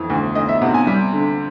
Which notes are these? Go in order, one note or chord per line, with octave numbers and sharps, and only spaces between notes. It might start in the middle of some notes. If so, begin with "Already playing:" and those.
Already playing: F2 E3
D2
D2 D#5
E5
C3 F#5
G#5
G3
D3